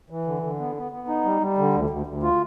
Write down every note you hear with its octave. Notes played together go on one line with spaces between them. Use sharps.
E3
D3
D3
B3
B3
B3
D#4
G3
G3
D3
D2
D2
D2
F4